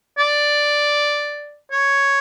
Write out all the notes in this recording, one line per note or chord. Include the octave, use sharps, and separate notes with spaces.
D5
C#5